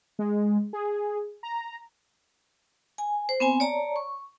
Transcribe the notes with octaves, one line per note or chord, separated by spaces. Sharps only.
G#3
G#4
A#5
G#5
C5
B3 C4 G#5
C#5 D5 A5 A#5
C#6